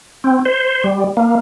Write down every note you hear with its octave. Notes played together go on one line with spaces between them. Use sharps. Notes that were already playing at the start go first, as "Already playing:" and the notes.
C4
C5
G3
A#3